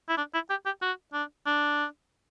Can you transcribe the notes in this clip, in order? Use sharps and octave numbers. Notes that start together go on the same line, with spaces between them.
E4
D4
E4
G4
G4
F#4
D4
D4